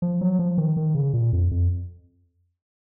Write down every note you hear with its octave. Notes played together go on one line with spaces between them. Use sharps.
F3
F#3
F3
D#3
D#3
C#3
A#2
F2
F2